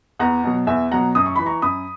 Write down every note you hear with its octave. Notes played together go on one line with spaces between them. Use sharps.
E2 F#5 A#5
B2 F#3
E2 E5 G#5
B2 F#3 F#5 A#5
F#2 D#6
C#6
E3 B5
A#5 C#6
F#2 B5 D#6